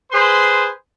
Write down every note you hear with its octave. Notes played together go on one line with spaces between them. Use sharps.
G#4 B4 C5 C6